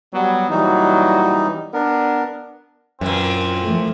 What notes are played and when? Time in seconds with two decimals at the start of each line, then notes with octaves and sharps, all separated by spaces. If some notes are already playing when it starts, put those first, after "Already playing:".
0.14 F#3 G3 B3
0.50 A#2 E3 F#3 G3 D#4
1.73 B3 D4 A#4
3.01 F#2 A#2 E3 C4
3.63 F3 A3